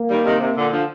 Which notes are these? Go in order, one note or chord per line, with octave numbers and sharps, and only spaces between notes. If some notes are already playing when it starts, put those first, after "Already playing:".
Already playing: A#3
D#3 G3
C3 D#3
C3
A#2 D3
D3 F3